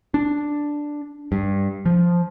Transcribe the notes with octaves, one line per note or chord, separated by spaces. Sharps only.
D4
G2
F3